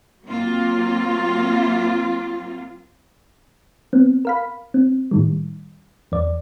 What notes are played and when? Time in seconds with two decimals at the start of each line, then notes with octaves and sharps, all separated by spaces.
0.23 F#3 A#3 C4 F4
3.93 B3 C4
4.25 A#4 F5 B5
4.74 C4
5.11 A2 D#3 G3
6.12 E2 D5